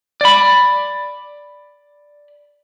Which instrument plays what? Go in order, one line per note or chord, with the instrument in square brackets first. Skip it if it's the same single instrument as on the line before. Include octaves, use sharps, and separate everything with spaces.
[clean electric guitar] D5 B5